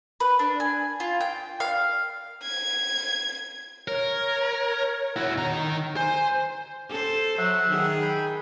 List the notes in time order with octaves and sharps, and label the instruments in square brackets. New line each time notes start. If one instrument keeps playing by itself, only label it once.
[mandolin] B4
D4
G#5
F4
G5
F5
[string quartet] G#6
[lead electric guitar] A#4 [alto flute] C#5
[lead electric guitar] E4 F#4
D#3 A#5
[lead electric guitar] C5 [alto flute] G#5
[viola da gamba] A4 C5
[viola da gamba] F#3 [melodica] E5 F#5
[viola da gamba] D#3 G#4
[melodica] G5 B5